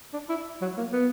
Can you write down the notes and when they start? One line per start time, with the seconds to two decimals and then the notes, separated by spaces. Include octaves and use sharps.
0.13 D4
0.29 E4
0.61 F#3
0.77 A#3
0.92 B3